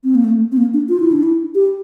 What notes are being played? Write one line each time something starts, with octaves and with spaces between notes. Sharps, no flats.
C4
A#3
A3
C4
A#3
D4
F4
E4
D4
E4
G4